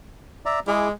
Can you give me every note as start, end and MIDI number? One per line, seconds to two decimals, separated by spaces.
0.46 0.60 74
0.46 0.60 76
0.46 0.60 82
0.67 0.92 56
0.67 0.88 64
0.67 0.88 68
0.67 0.88 86